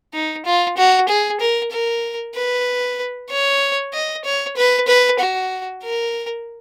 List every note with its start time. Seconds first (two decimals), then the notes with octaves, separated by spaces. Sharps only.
0.14 D#4
0.45 F4
0.77 F#4
1.08 G#4
1.40 A#4
1.71 A#4
2.35 B4
3.30 C#5
3.93 D#5
4.24 C#5
4.57 B4
4.87 B4
5.19 F#4
5.83 A#4